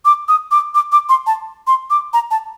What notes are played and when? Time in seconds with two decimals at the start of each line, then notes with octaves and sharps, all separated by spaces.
0.05 D6
0.28 D#6
0.51 D6
0.75 D6
0.92 D6
1.09 C6
1.27 A5
1.67 C6
1.90 D6
2.13 A#5
2.31 A5